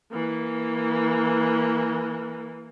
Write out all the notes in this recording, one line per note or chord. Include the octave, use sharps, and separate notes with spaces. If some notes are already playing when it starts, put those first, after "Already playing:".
E3 A#3